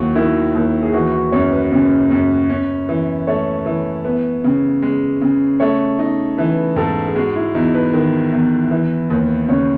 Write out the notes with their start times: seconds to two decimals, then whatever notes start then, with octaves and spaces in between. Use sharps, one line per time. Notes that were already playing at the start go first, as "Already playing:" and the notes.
Already playing: D#2 F#3 E4 F#4
0.15 D#3 E4
0.55 D#2
0.83 G#4
0.93 E3 F#4
1.13 F#4
1.32 F#2 C#5
1.52 B4
1.72 C#3
2.11 F#2
2.50 C#4
2.89 E3
3.27 A3 C#5
3.66 E3
4.05 B3
4.44 C#3
4.82 G#3
5.21 C#3
5.60 A3 C#5
5.99 D#4
6.38 E3 B4
6.76 G#2 A4
7.07 G#4
7.15 G#3 F#4
7.36 E4
7.55 E2 D#4
7.75 B4
7.94 D#3
8.32 E2
8.71 E3
9.10 D#2
9.48 C#3 C#5